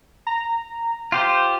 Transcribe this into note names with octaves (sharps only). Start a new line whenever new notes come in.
A#5
F4 G4 C5